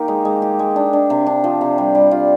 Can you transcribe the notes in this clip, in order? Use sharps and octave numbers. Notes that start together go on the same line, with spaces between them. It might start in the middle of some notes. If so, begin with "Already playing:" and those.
Already playing: D#3 A#3 D#4 G4
G#3
G#3
G4
G#3
D4
D4
C3
D4
F3
C3
G3
G3
F4